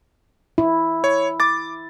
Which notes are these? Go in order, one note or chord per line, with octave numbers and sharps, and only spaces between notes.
E4
C#5
D6 A6